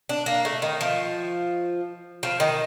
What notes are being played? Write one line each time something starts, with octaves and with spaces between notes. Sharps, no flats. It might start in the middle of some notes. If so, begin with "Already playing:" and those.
D4
A#3
A3
D#3
F3
F3
D#3